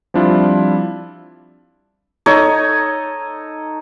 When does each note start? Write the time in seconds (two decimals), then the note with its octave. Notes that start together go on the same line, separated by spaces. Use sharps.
0.14 F3 G3 C4 D4 E4 F4
2.26 D#4 A4 C#5 D#5